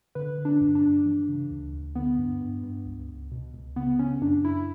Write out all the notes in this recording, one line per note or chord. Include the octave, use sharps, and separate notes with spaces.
D3 B4
D3
D4
G2
D4
G2
E3
C#3
D2
D2
D3 B3
G2
G2
G2
C#2
C#2
B2
C#2
C#3 B3
C#3 C#4
F#2 D4
F#2 E4